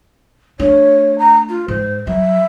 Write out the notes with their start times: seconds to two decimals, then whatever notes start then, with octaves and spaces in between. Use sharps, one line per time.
0.59 A3 D4 C#5
1.18 A#5
1.48 F4
1.68 G#2 C5
2.07 F#3 E5